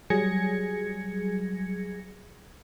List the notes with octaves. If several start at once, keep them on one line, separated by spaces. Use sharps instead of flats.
F#3 G3 G#4 G#6 A#6 C#7